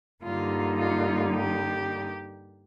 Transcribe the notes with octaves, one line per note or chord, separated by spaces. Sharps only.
G2 D3 G3 A#3 D#4 F4
F4
G4